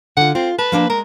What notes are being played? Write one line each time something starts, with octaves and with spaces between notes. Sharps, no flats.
D3 F4 F#5
C4 F4
B4 A5
F3 A#3 D4
G#3 A#4